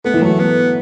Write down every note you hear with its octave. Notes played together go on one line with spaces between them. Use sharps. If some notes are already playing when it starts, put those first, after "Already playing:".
A3 B3
E3
F#3 A3
B3